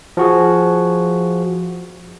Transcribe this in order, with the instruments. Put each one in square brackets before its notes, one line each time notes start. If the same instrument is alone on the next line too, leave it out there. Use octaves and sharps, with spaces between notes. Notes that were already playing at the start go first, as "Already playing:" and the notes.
[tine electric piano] F3 F#4 G#4